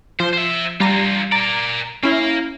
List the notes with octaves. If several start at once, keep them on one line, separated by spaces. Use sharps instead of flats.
F3 C5
C5 E5
G3 D4 F4 A#5 A#6
A#4 D5 A#5
A#3 C#4 E4 F5